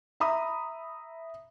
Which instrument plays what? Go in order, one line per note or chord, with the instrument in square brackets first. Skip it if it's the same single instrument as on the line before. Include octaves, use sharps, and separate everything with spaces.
[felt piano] E5 A#5 B5 D#6